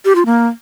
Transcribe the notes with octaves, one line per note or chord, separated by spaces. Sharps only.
G4
F4
A#3